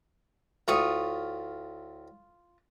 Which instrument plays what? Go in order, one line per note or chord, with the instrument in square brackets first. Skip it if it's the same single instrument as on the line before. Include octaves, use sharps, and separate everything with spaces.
[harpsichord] D2 A2 [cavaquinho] F4 C#6 D#6